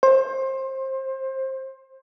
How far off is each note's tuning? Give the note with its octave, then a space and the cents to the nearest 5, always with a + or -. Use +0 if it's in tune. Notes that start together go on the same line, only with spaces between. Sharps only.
C5 +25